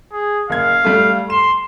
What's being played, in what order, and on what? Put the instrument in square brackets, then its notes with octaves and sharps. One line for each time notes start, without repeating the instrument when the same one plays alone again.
[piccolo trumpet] G#4
[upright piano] F#1 G#6 [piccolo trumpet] F5
[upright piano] G3 A3
[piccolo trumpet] C6 [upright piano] E7